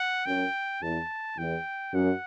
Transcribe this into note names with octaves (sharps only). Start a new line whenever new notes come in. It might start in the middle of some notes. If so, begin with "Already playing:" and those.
Already playing: F#5
F#2 G5
E2 A5
E2 G5
F#2 F#5